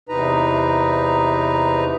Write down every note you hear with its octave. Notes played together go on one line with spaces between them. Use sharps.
E2 C3 D#4 B4 A#5